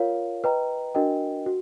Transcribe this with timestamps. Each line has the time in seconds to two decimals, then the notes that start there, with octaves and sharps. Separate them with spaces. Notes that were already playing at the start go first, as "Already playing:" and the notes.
Already playing: F4 A#4 C#5 F5
0.44 B4 D#5 G5 A#5
0.95 D4 F#4 A#4 D#5 G5
1.46 F#4